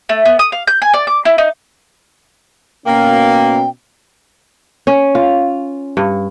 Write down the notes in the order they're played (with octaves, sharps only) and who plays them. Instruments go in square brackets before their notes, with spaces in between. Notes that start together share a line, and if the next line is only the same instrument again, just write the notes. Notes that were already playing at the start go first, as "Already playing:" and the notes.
[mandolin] A3
B3
D#6
F5
G6
G#5
D5
D6
E4
D#4
[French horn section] B2 C#4 [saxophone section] A#3 [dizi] G5
[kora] C#4
F4
G2